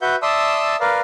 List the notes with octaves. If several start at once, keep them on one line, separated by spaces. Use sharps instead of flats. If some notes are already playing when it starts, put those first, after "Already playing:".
F#4 B4 E5 F#5 G6
D5 E5 A5 C6 D#6 E6
A#4 B4 D5 F5